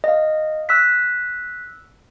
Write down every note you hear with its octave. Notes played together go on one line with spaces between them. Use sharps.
D#5 F5
E6 F#6 B6